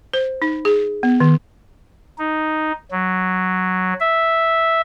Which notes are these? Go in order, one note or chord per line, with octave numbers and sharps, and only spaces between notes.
C5
D#4
G#4
B3
D#3
D#4
F#3
E5